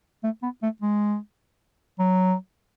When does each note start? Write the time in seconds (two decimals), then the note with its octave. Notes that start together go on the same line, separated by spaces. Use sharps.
0.24 A3
0.43 B3
0.63 A3
0.82 G#3
2.00 F#3